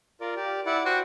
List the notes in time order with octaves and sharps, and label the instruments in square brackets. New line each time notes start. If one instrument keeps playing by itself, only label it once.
[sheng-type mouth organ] F4 A#4 D5
G4 D5
E4 D5 F#5
[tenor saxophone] F#4 [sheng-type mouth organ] C5 G5 C6